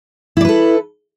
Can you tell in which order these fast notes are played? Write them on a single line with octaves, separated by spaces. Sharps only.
E4 D5 B4 A4